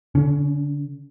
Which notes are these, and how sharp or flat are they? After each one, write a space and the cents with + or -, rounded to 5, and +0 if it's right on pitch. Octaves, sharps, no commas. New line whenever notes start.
D3 -25 C#4 +15